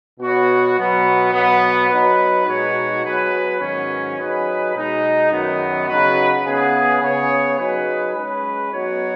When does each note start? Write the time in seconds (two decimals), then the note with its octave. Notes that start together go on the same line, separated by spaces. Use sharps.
0.19 B2 B3 F#4 C#5
0.76 B2 F#3 B3
1.33 B2 F#3 B3
1.89 F#3 D#4 B4
2.47 B2 G#3 D#4 F#4 C#5
3.03 F#3 B3 G#4 B4
3.60 G#2 D#3 F#3 C#4
4.18 F#3 D#4 G#4 B4
4.75 B2 G#3 D#4
5.31 F#2 D#3 F#3 B3
5.88 C#3 F#3 D#4 F#4 B4
6.45 C#3 B3 G#4 B4
7.02 C#3 B3 G#4 C#5
7.59 F#3 D#4 G#4 B4
8.16 G#3 C#4 B4
8.72 F#3 B3 D#4 F#4 C#5